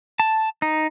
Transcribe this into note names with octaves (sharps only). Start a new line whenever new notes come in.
A5
D#4